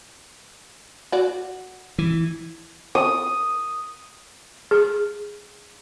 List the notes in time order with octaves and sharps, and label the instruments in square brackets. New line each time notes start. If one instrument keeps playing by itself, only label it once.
[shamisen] F#4 D5
[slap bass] E3
[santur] D#6
[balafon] G#4